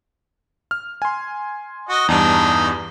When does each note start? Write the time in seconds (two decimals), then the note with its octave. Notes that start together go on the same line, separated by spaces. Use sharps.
0.71 F6
1.02 G#5 C6
1.89 F#4 D#5
2.08 E2 G2 D4 D#4